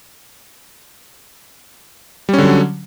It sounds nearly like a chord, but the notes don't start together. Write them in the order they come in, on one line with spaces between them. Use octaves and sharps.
G3 C#4 D3 F#3